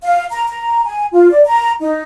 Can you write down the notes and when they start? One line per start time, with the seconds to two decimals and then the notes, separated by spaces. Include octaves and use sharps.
0.03 F5
0.32 A#5
0.48 A#5
0.85 G#5
1.13 F4
1.32 D5
1.46 A#5
1.81 D#4